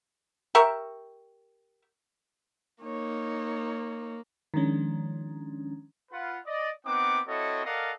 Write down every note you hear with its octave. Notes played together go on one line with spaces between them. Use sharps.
G4 A#4 E5 C#6
A#3 D#4 C#5
D#3 F3 G#3 C#4 D4
F4 B4 F#5
D5 D#5
B3 C4 D#4 F#5 D6
C4 E4 F#4 A4 C#5 D#5
A4 A#4 D5 D#5 F5 F#5